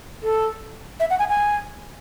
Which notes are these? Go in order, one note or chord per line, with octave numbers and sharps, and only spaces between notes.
A4
E5
F#5
G#5
G#5